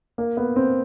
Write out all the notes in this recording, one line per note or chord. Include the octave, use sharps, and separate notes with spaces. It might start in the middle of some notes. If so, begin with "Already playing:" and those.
A#3
B3
C4